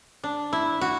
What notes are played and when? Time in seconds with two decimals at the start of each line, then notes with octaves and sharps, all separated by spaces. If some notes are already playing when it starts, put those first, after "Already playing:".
0.24 D4
0.53 E4
0.81 F#4